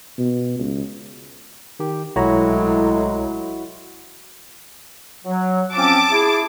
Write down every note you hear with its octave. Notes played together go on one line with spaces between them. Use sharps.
B2
C#2
D#3 G4
B1 A2 F#3 G#3 E4 F#4 C#5 A#5
F#3
F3 C4 C#4 A5 D6
E4 G#4